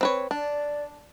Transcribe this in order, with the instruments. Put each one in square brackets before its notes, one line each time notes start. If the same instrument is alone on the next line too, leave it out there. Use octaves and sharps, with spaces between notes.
[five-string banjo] C4 B4 C#5
[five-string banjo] D4 [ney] D5